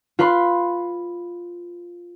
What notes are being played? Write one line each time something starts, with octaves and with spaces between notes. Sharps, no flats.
F4 B4 B5 C6